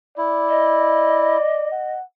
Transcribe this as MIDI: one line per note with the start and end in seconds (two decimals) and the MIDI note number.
0.18 1.37 64
0.18 1.69 74
0.49 1.94 75
1.72 2.03 78